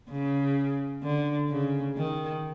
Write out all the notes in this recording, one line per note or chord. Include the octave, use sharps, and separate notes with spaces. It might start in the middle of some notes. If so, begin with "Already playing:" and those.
C#3
D3
C#3
D#3